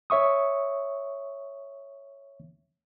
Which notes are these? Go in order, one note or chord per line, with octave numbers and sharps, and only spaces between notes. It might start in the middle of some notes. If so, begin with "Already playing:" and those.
C#5 E5 C#6 D#6